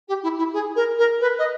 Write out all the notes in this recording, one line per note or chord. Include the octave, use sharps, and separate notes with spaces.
G4
E4
E4
G#4
A#4
A#4
B4
D#5